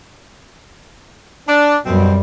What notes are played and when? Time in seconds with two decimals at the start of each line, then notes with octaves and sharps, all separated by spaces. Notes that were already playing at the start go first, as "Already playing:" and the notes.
1.48 D4
1.86 F#2 B2 G3 C4